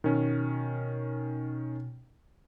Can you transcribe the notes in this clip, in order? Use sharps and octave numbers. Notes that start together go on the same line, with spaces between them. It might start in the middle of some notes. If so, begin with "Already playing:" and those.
B2 D#3 C#4